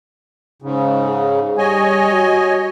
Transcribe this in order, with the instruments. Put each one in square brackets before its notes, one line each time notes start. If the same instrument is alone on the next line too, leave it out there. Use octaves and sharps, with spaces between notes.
[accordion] G#2 C#3
[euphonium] G#4
[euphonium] G3 [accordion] C#5 D#5 G#5
[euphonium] F#4